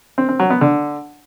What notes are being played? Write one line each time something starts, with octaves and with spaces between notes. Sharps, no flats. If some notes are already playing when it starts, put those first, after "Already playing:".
C4
C4
F#3
B3
D3